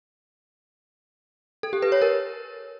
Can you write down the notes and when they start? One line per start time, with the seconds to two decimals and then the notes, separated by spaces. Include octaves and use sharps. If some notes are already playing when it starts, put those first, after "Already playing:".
1.63 A4
1.73 G4
1.82 B4
1.92 C#5
2.02 A#4